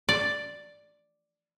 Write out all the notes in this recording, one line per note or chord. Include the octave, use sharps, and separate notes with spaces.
D5